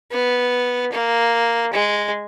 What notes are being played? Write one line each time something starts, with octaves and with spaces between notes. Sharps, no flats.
B3
A#3
G#3